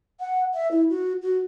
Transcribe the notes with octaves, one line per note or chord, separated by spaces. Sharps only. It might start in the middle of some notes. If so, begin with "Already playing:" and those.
F#5
E5
E4
F#4
F#4